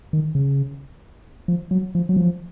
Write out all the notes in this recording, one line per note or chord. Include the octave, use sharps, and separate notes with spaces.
D#3
C#3
F3
F#3
F3
F#3
F3